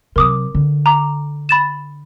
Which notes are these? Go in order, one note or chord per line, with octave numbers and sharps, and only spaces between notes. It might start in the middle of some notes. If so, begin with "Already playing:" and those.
C3 F#3 A#4 D6 D#6
D3
A#5 D6
B5 A6 E7